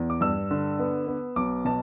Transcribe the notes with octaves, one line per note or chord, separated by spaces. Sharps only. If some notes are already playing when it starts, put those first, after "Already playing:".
Already playing: E2
D6
G2 E6
D3
B3
B3
B1 D6
B2 A5